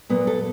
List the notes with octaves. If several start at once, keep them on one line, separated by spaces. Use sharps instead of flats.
A#2 F#3 B3
A4